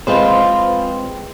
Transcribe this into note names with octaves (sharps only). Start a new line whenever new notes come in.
G#3 C4 F4 B4 C5